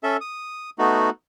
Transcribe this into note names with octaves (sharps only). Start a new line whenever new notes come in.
C#4 A4 E5
D#6
A3 B3 D#4 F#4